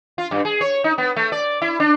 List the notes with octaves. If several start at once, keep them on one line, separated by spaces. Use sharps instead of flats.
F4
G2
G#4
C#5
D#4
B3
A3
D5
E4
D4